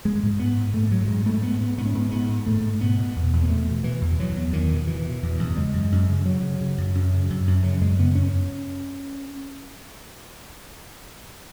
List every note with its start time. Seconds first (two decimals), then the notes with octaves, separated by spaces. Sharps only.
0.05 G#2 G#3
0.23 G#2
0.39 G#2 B3
0.56 G#2
0.73 G#2 A3
0.91 G#2 F#3
1.08 G#2 G#3
1.25 G#2 A3
1.43 G#2 B3
1.60 G#2 B3
1.78 G#2 B3
1.86 C#4
1.94 G#2 B3
2.11 G#2 B3
2.29 G#2
2.46 G#2 A3
2.64 G#2
2.81 B2 B3
2.99 B2
3.16 E2
3.33 E2
3.43 B3
3.49 B2 A3
3.68 B2
3.84 B2 E3
4.02 E2
4.19 E2 F#3
4.37 E2
4.53 E2 D#3
4.71 B2
4.87 B2 E3
5.06 B2
5.23 E2
5.39 E2
5.56 C#3 G#3
5.74 F#2
5.92 F#2
6.09 C#3
6.26 C#3 F#3
6.43 C#3
6.61 C#3
6.78 F#2
6.95 F#2
7.13 C#3
7.30 F#2
7.47 F#2
7.63 C#3 F#3
7.81 F#2 G#3
7.99 C#3 B3
8.15 F#2 C#4